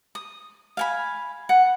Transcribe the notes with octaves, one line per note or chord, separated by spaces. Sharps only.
D#6
F5 G#5 B5
F#5